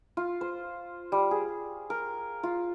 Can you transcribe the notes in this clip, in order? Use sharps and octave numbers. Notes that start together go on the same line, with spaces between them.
F4
C5
G3
G#4
A#4
F4